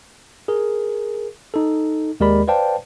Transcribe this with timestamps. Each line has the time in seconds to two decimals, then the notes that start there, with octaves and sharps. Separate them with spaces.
0.48 G#4 A#4
1.54 D#4 A4
2.20 D#2 G#3 G4 A#4 D5 B5
2.48 B4 C5 D5 F5 G5 A5